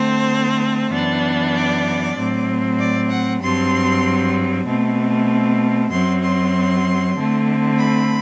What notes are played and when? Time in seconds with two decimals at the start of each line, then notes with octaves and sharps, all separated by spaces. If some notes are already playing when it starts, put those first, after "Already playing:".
Already playing: D3 A3 C4 C5
0.91 F#2 E3 B3 D4
1.54 D5
2.16 A2 F#3 C4
2.79 D5
3.10 F#5
3.40 G2 F#3 C4 C6
4.66 B2 A3 C4
5.90 F#2 F#3 C4 C6
6.23 C6
7.16 D3 A3 C4
7.78 B5